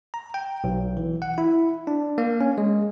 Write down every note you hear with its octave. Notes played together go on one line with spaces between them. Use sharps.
A#5
G5
B1
E3
F#5
E4
D4
A#3
C#4
G#3